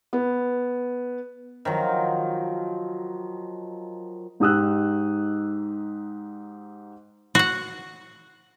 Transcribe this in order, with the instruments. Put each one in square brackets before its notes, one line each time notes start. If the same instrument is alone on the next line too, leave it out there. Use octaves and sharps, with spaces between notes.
[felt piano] B3
[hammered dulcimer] D#3 F3 F#3
[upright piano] G#2 D#4 G4 D#6 E6 F#6
[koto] F#4 F#5